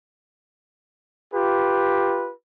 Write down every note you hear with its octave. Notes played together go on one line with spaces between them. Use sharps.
F4 G4 B4